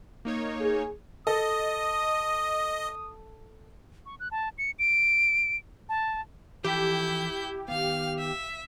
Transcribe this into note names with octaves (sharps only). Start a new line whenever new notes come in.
A#3 D#4 C#5
G#4
A4 D#5 D#6
C#6
F#6
A5
C#7
D7
A5
E3 F3 E4 G4 A4 G6
D#3 B3 F5 F6
E5